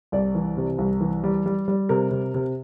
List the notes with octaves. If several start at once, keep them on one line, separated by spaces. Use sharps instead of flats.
C2 D5
E3
C3
C2
E3
G3
G3
G3
C3 A#4
C3
C3